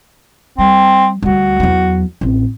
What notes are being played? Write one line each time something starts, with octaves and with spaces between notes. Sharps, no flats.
G3 C4
D2 G3 F#4
E2 F#3
A1 C4